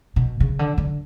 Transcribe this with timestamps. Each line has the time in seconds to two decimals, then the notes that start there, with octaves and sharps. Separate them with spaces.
0.16 B2
0.40 C#3
0.59 D3
0.78 D3